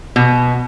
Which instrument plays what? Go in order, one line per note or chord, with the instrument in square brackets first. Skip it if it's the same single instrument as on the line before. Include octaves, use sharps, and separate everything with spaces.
[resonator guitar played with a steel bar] B2